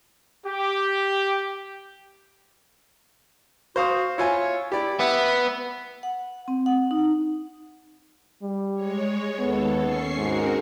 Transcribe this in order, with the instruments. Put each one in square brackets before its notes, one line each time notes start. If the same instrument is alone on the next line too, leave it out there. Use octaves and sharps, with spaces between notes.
[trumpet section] G4
[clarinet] F#4 [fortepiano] C5 F5 D#6
[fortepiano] E4 F4 G#5 [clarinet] C#5
[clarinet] E4 [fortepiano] G4 D5
[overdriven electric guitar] B3 [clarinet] E5
[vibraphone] F#5
C4
F#5
D#4
[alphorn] G3
[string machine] G#3 C#5
[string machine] D#2 A4 [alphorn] B3
[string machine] C#4 C#6 C7
[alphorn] G#2 [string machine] C4 F#4 A#4